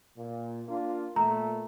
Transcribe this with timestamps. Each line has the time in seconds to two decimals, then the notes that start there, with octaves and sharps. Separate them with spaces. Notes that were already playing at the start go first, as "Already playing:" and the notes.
0.17 A#2
0.68 A#3 D4 F4
1.16 A#2 A3 A#5